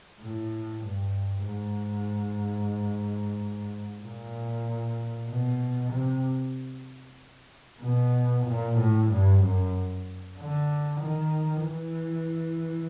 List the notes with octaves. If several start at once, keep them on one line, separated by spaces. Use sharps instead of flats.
A2
G2
G#2
A#2
B2
C3
B2
A#2
A2
G2
F#2
D3
D#3
E3